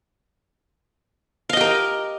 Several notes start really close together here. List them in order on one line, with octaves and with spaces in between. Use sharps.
F5 D#5 G4 A#4